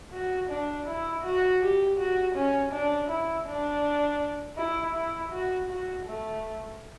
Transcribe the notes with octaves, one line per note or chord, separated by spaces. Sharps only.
F#4
D4
E4
F#4
G4
F#4
C#4
D4
E4
D4
E4
E4
F#4
F#4
A3